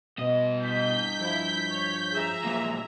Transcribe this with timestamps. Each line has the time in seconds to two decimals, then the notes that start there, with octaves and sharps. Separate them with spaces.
0.18 G2 B2 D#5
0.59 G6 B6
1.20 F3 E4
1.70 C#5
2.14 G#4 E5 A#5
2.44 C#2 A#2